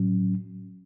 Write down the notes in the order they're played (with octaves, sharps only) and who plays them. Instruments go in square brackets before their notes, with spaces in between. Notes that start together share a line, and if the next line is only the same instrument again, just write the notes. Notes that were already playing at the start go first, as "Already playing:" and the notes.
Already playing: [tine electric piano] A2 F#3 C#4